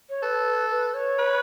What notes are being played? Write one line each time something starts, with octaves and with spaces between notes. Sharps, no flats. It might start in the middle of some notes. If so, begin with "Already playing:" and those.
C#5
A4 B4
B4
C#5
B4